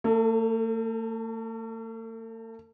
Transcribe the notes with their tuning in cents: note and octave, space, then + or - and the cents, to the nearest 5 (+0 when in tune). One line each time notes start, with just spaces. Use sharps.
A3 +45 A4 +0